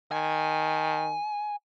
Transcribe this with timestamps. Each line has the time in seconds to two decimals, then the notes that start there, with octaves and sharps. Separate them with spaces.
0.12 D#3 G#5